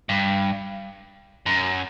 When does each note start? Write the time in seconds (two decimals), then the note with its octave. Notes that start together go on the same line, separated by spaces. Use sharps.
0.09 G2
1.46 F#2